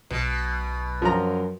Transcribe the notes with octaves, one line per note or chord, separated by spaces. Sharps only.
B1 B2
F#2 F3 A#5